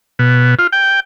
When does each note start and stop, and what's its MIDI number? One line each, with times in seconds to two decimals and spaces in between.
0.19 0.55 47
0.59 0.67 65
0.72 1.00 79